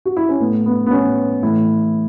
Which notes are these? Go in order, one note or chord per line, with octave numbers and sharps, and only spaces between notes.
F#4
E4
C#4
A2 A3 B3
B3
B3
C#4
A2 E3 A3 E4